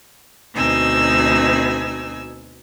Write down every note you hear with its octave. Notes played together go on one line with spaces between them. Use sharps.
D2 B2 C4 D#4 G#5 E6